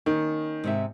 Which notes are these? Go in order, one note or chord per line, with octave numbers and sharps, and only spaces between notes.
D#3 A#3 C#4
G#2 C3 E5